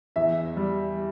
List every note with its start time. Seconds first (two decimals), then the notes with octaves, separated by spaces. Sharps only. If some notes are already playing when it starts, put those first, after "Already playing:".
0.16 E2 E5
0.57 G3